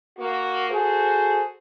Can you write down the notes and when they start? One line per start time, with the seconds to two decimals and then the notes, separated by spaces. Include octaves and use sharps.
0.19 A#3 F#4
0.70 F#4 G#4 A4 C5